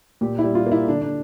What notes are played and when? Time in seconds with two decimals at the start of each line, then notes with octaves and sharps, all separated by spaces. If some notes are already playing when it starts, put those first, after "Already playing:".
0.21 A#2 G4
0.38 E4
0.44 G3
0.55 F4
0.66 A#3
0.72 E4
0.88 D3 D4
1.02 D4